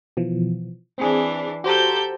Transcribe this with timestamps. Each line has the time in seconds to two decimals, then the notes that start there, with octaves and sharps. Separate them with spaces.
0.17 B2 E3 F3
0.98 E3 C4 D4 G#4
1.64 F#4 G4 A4 C5 A#5 G6